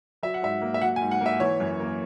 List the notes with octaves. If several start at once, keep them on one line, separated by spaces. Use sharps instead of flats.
F#3 E5
F#5
G#2 E5
A#3
E5
F#3 F#5
G#5
G#2
F#5
A#3
E5
E3 C#5
F#2
A#3